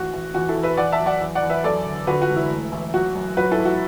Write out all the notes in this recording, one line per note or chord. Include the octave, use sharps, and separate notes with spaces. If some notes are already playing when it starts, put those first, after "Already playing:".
Already playing: A1 F#4
A1
E2 F#4
E4 A4
E2
B4 E5
E2 D5 F#5
E5 A5
F#3
D5 F#5
E2
D5 F#5
E2
B4 E5
F#2 A4 D5
D3
D3 F#4 B4
F#4
E1
E4
A3
A1
F#3 F#4
F#2
F#3 F#4 B4
E4 A4
A1
F#4